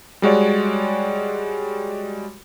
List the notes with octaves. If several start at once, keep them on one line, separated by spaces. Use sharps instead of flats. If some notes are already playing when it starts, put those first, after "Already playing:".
G3 G#3 F#4 C#5 D5